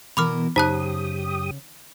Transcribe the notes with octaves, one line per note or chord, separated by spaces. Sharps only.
B2 E3 A#4 B5 D6 F6
F#2 C#3 D#4 G4 C5 A5 D#6 F#6